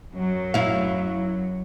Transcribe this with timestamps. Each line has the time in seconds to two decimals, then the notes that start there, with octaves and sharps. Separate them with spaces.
0.11 F#2 F#3
0.54 E4 F5